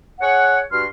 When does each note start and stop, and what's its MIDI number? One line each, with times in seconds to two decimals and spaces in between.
0.21 0.61 68
0.21 0.61 73
0.21 0.61 78
0.72 0.86 43
0.72 0.86 66
0.72 0.86 84
0.72 0.86 89